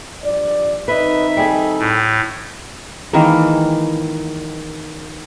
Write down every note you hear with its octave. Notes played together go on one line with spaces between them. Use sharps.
G2 F3 D5
D#3 C4 D#4 B4 D#5 E5
G3 G#4 A4
A2
D#3 E3 G#3 A#3